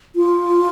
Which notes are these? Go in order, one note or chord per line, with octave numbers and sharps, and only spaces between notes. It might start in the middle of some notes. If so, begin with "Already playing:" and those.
F4